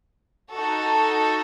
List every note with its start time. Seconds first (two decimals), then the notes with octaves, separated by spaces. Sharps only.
0.52 D#4 F#4 A4